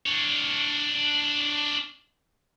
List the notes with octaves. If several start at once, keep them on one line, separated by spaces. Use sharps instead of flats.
D4 C#5